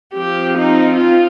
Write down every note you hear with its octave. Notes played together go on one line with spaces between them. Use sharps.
F3 C4 G4
D#4
F4